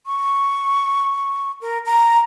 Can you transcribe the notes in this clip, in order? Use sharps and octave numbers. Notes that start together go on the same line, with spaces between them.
C#6
A#4
A#5